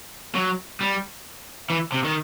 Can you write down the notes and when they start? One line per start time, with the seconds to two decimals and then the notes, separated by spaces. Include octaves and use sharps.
0.35 F#3
0.81 G3
1.70 E3
1.92 C3
2.05 D#3